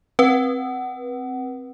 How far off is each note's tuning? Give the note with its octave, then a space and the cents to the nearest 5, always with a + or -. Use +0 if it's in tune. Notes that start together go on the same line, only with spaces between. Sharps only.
C4 +0 B4 -25 F#5 +20